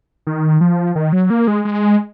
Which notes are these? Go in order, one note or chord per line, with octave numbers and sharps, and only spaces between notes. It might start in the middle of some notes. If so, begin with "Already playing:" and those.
D#3
F3
D#3
F#3
A#3
G#3
G#3